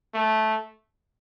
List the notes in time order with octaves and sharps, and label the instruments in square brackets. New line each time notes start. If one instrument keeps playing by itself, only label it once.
[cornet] A3